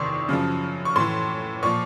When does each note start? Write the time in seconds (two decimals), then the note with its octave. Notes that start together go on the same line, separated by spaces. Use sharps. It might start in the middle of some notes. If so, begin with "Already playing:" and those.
Already playing: E2 C3 D#3 C6 C#6
0.29 F#2 C#3 F3
0.85 C#6
0.96 A2 E3 C6
1.63 A#2 F3 C#6